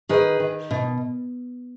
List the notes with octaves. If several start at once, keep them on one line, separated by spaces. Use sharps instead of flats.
D#3 G#4 B4
D#3
B2